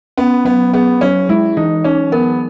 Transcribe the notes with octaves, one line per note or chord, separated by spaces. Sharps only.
B3 C#4
F#3 B3
B3 G#4
F#3 C#4
G#3 E4
E3 D#4
C#4 D#4
B3 A#4